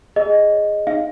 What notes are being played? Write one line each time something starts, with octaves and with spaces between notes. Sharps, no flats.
G#4 D#5
C#5
D#4 F5